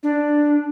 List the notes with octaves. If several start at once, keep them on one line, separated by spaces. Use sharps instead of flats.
D4